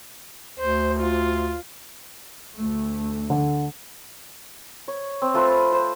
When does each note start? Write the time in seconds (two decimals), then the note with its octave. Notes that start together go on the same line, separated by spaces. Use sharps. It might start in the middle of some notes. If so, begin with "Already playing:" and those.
0.59 D2 C5
1.00 F4
2.56 D2 A3
3.30 D3
4.88 C#5
5.22 C4
5.34 A3 F4 A4 B4
5.72 C5